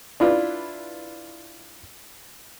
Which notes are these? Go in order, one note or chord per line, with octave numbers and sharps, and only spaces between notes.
D4 E4 F4 B4 D5